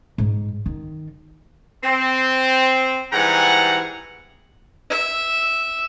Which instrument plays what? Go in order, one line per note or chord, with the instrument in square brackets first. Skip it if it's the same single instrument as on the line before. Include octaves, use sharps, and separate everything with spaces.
[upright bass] G#2
D#3
[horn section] C4
G#2 E3 G3 F#5 G#5 A#5
[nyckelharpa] E5